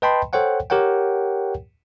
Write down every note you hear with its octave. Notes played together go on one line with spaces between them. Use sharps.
B4 D#5 G5 A5 B5 C6
A4 C5 C#5 F#5 G5
G4 A#4 C#5 F#5 G5